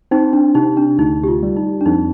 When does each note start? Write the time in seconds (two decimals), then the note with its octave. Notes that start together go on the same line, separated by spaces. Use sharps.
0.11 C4 D#4
0.33 D4
0.55 C3 D#4
0.77 D4
0.98 D2 D#4
1.23 G4
1.28 F4
1.43 G3
1.57 D#4
1.81 D4
1.86 F2 D#4